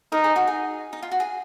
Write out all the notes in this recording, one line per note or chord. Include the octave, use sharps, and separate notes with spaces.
D#4 A#4
G#4
F#4
G#4
D#4
F4
F#4
G#4